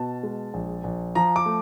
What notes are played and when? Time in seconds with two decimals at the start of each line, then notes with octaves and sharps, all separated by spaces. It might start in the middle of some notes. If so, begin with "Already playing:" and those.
Already playing: B2 A5
0.23 G#3
0.54 A#1
0.84 A#1
1.15 F3 A#5
1.36 D6
1.46 A3